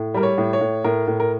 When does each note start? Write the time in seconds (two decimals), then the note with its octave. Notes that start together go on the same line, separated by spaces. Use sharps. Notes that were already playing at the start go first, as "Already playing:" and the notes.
Already playing: A2
0.14 G3 A#4
0.23 C#5
0.38 A2
0.53 C#5
0.61 A2
0.84 A2 A#4
1.07 A2
1.20 A#4